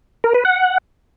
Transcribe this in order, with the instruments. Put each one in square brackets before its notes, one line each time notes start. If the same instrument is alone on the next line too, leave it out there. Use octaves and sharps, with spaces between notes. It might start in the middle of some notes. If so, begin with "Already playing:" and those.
[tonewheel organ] A#4
B4
F#5